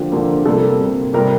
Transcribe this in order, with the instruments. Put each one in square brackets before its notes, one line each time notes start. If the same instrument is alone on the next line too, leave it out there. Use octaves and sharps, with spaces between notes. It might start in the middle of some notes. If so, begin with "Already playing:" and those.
Already playing: [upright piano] D3 F3 A#3 G4
D3 F3 A#3
C3 G3 A#3 A4
C3 G3 A#3
C3 G3 A#3 A#4